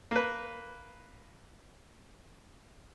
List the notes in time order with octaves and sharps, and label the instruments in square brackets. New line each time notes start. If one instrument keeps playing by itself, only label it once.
[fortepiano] A#3 B4